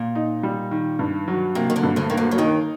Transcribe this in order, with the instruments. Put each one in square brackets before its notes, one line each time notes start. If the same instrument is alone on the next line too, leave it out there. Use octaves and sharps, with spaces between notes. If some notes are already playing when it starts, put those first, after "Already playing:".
Already playing: [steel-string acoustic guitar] A#2
[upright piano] D#4
G3
D#3
G2
F#3
[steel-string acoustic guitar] C3 [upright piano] A#3
[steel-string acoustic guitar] D#3
D2 D3
[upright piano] G2
[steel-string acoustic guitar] D2 D3
[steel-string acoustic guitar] D#3 [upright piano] A#3
[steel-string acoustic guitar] D2 D3
F#3
[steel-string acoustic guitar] D#2 D#3 [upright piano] D#4